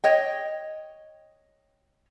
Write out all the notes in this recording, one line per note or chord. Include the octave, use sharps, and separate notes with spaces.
C#5 D#5 G5